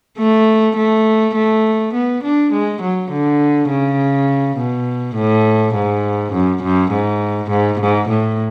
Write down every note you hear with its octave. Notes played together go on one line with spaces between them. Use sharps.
A3
A3
A3
B3
D4
G#3
F#3
D3
C#3
B2
A2
G#2
F#2
F#2
G#2
G#2
G#2
A2